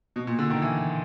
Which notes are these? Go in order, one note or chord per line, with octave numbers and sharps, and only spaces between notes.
B2
A#2
D3
D#3
E3